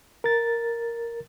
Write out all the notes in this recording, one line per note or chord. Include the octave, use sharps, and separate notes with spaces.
A#4 A6